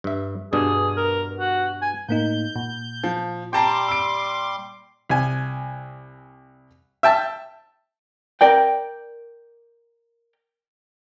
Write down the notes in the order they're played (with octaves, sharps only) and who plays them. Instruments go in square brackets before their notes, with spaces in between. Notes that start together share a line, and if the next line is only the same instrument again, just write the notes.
[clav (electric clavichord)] G2 E5
[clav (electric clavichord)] G2 B2 D4 [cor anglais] G#4
[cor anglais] A#4
F#4
G#5
[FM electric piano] A2 A#3 D#4 [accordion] G6
[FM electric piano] A#2
[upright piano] F3
[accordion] G3 C6 D6 [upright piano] G5 A5 A#5
[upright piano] E6 D7
[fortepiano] C2 G#5
E5 G5 A5
[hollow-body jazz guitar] A#4 D5 G5